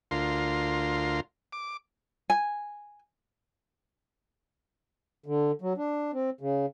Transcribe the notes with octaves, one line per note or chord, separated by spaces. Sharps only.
D2 F4 A#4 C6
D6
G#5
D3
F#3
D4
C4
C#3